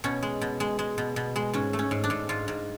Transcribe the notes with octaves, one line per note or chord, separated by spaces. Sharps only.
B2 C#4
G#3
B2
G#3
G#3
B2
B2
G#3
G#2 C#4
A3
C#4
G#2
D4
G#2
G#2 F4
G#2